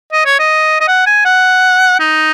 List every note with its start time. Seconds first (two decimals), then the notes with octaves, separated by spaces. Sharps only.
0.12 D#5
0.25 C#5
0.39 D#5
0.81 D#5
0.88 F#5
1.06 G#5
1.25 F#5
2.00 D#4